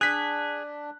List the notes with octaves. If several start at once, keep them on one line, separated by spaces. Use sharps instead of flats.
D4 G#4 F#6 B6